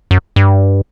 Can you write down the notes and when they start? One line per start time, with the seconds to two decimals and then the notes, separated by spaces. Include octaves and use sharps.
0.11 F#2
0.36 G2